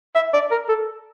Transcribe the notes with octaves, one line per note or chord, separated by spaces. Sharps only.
E5
D5
A#4
A4